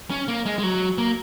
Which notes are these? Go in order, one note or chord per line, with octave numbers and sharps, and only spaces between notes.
C#4
A#3
G#3
G#3
F#3
A#3